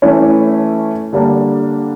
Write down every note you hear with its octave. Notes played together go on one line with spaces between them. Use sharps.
E3 A3 C#4 E4
D3 G3 A#3 D4